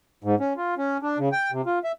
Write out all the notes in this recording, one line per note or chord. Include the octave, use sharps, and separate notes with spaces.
G#2
C#4
F4
C#4
D4
C#3
G5
C3
F4
E5